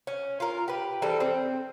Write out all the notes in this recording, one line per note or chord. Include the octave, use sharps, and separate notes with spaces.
C#4
F4 A#4
G4 B4
E3 G3 C4 A4
C4